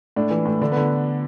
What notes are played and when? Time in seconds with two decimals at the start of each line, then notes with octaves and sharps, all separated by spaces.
0.16 A2 D4
0.31 E3
0.46 A2
0.61 D3 D4
0.72 D3 B3